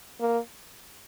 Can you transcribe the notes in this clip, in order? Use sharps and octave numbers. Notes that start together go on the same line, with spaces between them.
A#3